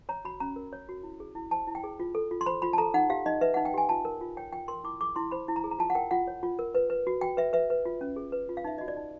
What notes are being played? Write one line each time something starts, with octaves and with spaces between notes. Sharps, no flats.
C#5 A#5
F#4 B5
C#4 A#5
A#4
C#5
F#4
E4
G#4
E4
C5 A5
E4
G5
G#4
F4
A4
F4
C6
C5 B5
F4 B5
A5
A4 A#5
D#4 F#5
G4 F5
D#4 D#5
B4 E5
F#5
D#4
G5
G4 G#5
F4 A5
A#4
F4
C#5 G5
F4 G5
A#4 C6
E4 D6
G#4 D6
E4 C6
C5 B5
E4
A#5
G#4
A#5
F4 A5
F#5
A#4 G5
F4 F#5
C#5
F4
A#4
B4
B4
F#4
F#4 G5
B4 E5
B4 E5
B4
F4
C#4
G#4
B4
F4
F5
D#4 E5
F#4 D#5
D5
D#4